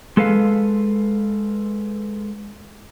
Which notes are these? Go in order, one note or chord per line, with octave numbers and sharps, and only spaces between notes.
G#3 A4 B4 F5